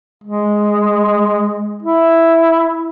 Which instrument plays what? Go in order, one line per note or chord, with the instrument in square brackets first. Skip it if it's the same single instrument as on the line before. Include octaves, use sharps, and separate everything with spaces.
[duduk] G#3
E4